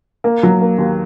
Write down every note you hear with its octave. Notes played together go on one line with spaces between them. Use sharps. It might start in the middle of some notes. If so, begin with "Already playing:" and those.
A#3
F#3
A#3
D#2